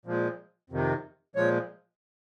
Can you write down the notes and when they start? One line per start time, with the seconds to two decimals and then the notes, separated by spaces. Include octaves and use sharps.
0.05 A#2 F3 G#3
0.70 F2 C3 D#3
1.36 A#2 F3 G#3 C#5